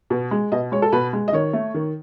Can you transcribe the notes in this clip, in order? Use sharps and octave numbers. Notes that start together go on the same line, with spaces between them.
B2
G#3
B2 D#5
G#3 C#5
A4
B2 B4
G#3
D#5
D#3 C#5
A3
D#3